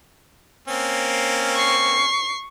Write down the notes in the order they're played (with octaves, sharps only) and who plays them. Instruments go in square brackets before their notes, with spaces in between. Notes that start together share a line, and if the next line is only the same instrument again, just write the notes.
[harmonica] A#3 C4 C#4
[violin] C#6 C7